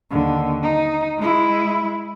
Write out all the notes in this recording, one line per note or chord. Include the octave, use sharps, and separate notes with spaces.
D#2 D3
D#4
G#3 E4